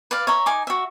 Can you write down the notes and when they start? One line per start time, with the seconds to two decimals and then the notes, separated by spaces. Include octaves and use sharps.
0.11 B4 D5 F5
0.27 C#5 E5 A#5
0.46 D#4 G#5 D6
0.67 F#4 E5